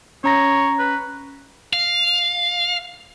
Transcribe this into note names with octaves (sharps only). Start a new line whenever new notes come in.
C#4 C#5 A#5 A#6
B4
F5